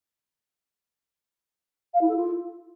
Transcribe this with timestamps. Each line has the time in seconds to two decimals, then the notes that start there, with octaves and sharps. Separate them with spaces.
1.93 F5
2.01 E4
2.08 A4
2.16 F4